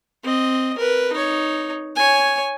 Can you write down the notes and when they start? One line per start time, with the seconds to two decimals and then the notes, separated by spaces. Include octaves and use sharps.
0.24 C4 D#5
0.78 A#4 B4
1.13 D#4 C#5
1.96 C#5 G#5